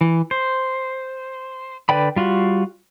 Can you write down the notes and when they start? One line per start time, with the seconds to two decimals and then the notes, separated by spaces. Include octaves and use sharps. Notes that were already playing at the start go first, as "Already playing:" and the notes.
0.01 E3
0.31 C5
1.89 D3 B4 D5 G5 B5
2.16 G3 F4 F#4